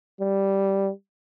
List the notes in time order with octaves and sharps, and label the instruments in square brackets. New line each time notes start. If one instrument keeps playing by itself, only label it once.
[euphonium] G3